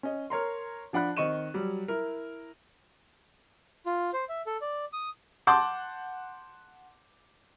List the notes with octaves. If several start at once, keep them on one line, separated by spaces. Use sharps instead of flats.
C#4 D#5
A#4 C#5 A#5 C6
F3 D4 F#5 B5 F#6
D#3 C4 D#5 C#6 D#7 E7
F#3 G3
E4 A#4
F4
C5
E5
A4
D5
D#6
F#5 A5 C6 D6 G6